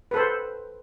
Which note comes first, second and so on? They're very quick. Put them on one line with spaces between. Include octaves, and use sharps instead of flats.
B4 A4 C5